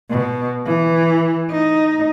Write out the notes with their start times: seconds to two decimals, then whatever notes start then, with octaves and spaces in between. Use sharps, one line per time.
0.10 B2
0.66 E3
1.50 D#4